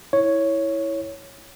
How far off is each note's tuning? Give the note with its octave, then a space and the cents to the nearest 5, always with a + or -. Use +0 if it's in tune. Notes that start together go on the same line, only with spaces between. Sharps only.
E4 -10 C#5 +0